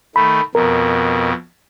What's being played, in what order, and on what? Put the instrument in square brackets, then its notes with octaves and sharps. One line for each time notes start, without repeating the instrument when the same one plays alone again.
[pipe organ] D#3 A3 [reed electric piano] B5
[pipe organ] F2 B2 [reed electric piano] A#4